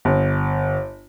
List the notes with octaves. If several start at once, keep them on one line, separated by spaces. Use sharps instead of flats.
G1